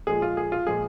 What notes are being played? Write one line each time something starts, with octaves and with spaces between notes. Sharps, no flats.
A#2 F3 G#3 G#4
F4
G#4
F4
A#2 F3 G#3 G#4